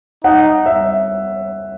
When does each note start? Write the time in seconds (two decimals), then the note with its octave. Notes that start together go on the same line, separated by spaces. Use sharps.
0.24 D#4 F#5
0.66 E5